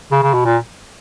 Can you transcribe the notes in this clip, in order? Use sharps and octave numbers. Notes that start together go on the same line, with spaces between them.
C#3
C#3
B2
A#2